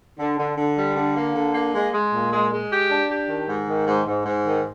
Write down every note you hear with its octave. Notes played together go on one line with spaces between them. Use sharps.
D3
D3
D3
G3
D3
A#3
D3
A#3
G#3
G#3
A#2
G#3
G#3
G4
D4
G4
D#3
G#2
D#3
G#2
G#2
G#2
D#3